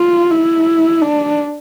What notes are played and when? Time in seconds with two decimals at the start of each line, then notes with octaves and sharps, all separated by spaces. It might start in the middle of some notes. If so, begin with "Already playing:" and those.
Already playing: F4
0.31 E4
1.02 D4